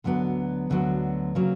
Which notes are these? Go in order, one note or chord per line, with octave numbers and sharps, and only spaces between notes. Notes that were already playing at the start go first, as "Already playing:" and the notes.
D2 D3 F#3 B3
D2 D3 F#3 B3
C#3 F#3 A#3